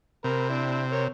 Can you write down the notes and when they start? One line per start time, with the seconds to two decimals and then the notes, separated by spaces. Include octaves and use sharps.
0.24 C3 A#4 B5
0.49 C4 D4 E4
0.91 A#4 C#5